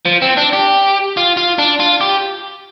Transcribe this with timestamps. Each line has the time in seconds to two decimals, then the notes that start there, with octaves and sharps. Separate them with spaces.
0.05 F3
0.22 C4
0.37 D4
0.53 G4
1.17 F4
1.37 F4
1.59 D4
1.80 F4
2.01 G4